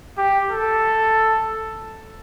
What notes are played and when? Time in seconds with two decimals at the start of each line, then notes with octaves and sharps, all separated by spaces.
0.18 G4
0.50 A4